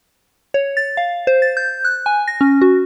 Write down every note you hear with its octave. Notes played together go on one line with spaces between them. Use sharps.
C#5
A6
F5
C5
A6
G6
F#6
G#5
A#6
C#4
F#4